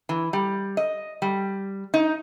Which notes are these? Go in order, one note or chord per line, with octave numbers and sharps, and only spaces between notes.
E3
G3
D#5
G3
D#4